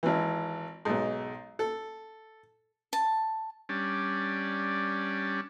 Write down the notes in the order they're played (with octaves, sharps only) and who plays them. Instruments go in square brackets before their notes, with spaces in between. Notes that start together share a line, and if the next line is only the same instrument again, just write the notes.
[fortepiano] G#1 E3
B1 G#2
A4
[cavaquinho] A5
[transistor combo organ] G3 C#4 D4